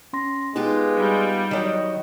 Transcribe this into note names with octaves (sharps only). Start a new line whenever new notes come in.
C#4 C6 A#6
G#3 B3 D#4 F4 G4
G3
D#3 F#3 D#5